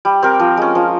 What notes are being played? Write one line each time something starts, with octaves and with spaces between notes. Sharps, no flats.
G3
C4 G4 A#4
F3
G#3 C#4
F3